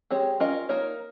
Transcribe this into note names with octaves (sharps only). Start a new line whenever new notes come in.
G#3 C4 G4 C#5
C#4 F4 A#4 D#5
A#3 D#4 A#4 C#5